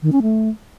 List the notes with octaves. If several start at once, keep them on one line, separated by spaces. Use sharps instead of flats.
D#3
C#4
A3